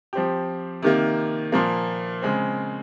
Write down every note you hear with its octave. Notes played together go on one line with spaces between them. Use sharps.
F3 C4 G4
C3 D#3 A#3
A#2 F3 A#3
C#3 G#3 C4